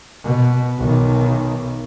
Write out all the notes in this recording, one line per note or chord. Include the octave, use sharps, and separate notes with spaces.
B2
B1 D#3